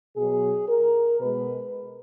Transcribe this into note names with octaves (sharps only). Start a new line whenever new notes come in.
B2 F#3 G#4
A#4
B2 G#3 B4